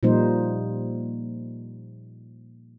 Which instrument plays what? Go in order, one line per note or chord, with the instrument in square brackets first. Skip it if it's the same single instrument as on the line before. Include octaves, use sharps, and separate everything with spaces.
[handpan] A#2 F3 G3 A#3 D#4 C5